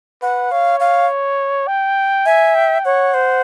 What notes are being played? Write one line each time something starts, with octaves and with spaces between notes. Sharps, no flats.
B4 F#5
C#5 F5
F5
G5
E5 G#5
G5
C#5 F#5
C5